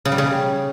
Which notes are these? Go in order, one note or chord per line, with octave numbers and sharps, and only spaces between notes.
C#3
G3
C#3